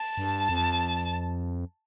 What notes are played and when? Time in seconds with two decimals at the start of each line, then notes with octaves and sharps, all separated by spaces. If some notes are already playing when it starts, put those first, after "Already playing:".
Already playing: A5
0.17 G2
0.49 F2